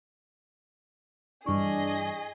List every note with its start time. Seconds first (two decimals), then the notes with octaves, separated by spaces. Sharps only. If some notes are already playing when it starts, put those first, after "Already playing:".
1.46 G2 E3 D4 G#4 D#5 C#6